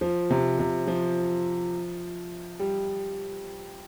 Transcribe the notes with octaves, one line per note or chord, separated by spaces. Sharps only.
F3
C3
C3
F3
G3